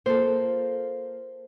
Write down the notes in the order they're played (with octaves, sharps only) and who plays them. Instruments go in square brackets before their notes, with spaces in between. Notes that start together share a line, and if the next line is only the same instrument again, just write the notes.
[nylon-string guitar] A#3 F4 A4 [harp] C5